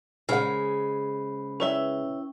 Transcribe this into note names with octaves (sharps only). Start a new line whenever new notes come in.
C#3 G#3 A#4 C5 F#5 B5
C#4 E4 B4 C#5 E5 G5